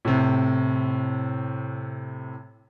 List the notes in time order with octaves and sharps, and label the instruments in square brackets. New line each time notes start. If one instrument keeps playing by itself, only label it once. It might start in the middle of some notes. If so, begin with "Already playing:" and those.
[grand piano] A2 C3